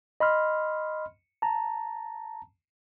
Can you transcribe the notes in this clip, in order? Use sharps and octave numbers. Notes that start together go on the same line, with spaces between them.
D#5 B5 C6 F6
A5 A#5